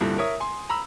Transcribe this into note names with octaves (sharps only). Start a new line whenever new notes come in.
C2 G2 A#2 D3
A#4 C#5 E5 D#6
G#5 C6
A#5 B5 E6